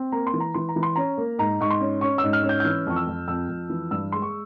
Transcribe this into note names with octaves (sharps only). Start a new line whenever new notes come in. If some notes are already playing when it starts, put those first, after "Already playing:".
Already playing: C4
A#3 A#5
C6
E3
A#5
E3 C6
A#5
E3
C6
C#4 A#5
A#3
G#2 A#5
G#2 C#6
C6
C#4
C#4 C#6
E6
G#2
F6
C#4
G6
G6
E3 F6
F2 C#6
E6
F2
F2 E6
F2
E3
G2 E6
G#3 C6
C#6